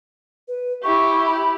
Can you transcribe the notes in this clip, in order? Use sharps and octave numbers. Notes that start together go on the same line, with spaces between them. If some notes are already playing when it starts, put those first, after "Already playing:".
B4
E4 G4 C#6
B5